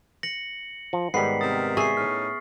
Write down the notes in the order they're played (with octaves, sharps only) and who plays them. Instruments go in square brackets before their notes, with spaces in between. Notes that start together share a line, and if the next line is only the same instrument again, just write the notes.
[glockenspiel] A#6 C#7 F#7
[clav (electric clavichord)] F3
[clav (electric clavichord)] G#2 D#3 G3 [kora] B3 [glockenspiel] B6 C7
[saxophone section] C3 A#4 [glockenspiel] D#6 A6
[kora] G#4 E5 [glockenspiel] C#6 C7
[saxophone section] A2 C#4 D#4 [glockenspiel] F6